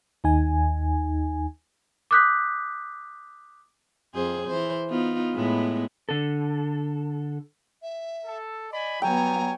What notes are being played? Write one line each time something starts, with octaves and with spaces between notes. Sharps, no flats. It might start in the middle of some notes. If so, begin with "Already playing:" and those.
D#2 D#4 G#5
D6 D#6 F#6 G6 B6
F2 G#4 C5
E3 C5
B3 D#4 F4
A2 G#3 B3
D3 A4
E5
A4
D5 D#5 G#5 B5
F#3 G3 B3 C#5 G5 G#5 A#5